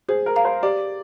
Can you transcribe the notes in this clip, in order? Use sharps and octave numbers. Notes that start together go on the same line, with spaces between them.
G#4 C5
A#4
F5 A#5
C5
G4 D5